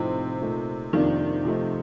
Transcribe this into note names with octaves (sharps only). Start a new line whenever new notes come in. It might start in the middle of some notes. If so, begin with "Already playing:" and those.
Already playing: A2 C3 F3 C4 D#4
A#2 A3 D#4
F2 C3 D#3 F3 A#3 D4
C3 F3 A3 C4 D#4